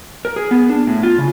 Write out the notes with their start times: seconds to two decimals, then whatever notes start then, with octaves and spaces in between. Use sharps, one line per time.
0.25 A#4
0.36 G#4
0.51 B3
0.69 D4
0.87 A2
1.03 F4
1.18 C#3